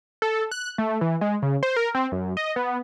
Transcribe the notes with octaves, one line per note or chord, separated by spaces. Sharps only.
A4
F#6
A3
E3
G#3
C#3
C5
A#4
C4
F#2
D#5
B3